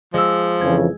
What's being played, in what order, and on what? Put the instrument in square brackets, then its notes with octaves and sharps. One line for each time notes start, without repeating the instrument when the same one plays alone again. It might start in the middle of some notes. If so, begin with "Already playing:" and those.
[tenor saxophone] F3 [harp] G#3 E6
[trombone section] F2 C#3 E3 [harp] G#6